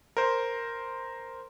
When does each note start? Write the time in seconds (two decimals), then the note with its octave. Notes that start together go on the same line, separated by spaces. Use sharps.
0.17 A#4 C5